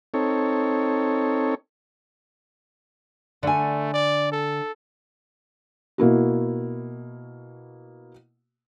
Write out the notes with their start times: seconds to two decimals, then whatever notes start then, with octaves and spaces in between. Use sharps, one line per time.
0.14 C4 D#4 A4 C#5
3.43 D3 A3 G#5
3.94 D5
4.32 A4
5.98 B2 A#3 E4 F#4